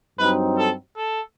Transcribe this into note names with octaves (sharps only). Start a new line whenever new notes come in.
G2 F#3 C4 D#4 B4
A4
A4